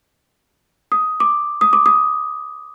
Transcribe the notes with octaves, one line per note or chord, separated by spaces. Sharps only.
D#6
D6
D#6
D6
D#6